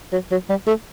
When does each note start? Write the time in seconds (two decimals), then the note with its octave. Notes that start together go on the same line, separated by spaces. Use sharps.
0.13 F#3
0.31 F#3
0.49 G3
0.67 A3